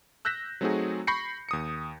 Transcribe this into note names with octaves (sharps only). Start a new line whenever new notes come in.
E6 F#6 G6 A#6 B6 E7
F#3 A3 C4 D#4 F#4 G#4
B5 C#6 G6 A#6 C7 C#7
D#2 D#6 C#7